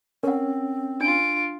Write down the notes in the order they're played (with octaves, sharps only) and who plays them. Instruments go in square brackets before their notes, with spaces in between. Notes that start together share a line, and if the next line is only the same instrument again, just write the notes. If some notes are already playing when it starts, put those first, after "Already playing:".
[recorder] C4 [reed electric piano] C#4 [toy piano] A#4 F#5
[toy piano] D4 [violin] F4 D7